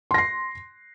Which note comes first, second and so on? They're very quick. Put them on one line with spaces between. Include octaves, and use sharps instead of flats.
C6 A#6 C7